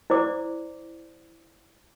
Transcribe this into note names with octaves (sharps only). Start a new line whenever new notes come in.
E4 C5 D5 D6